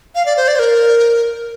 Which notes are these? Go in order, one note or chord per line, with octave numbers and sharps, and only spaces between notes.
F5
D5
C5
D5
C5
A#4